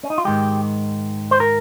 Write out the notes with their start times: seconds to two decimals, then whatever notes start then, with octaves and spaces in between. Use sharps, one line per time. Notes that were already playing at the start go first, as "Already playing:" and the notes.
0.03 C#4
0.10 D#4
0.18 F4
0.25 G#2 D#3 G#3 G4
1.31 C5
1.40 A#4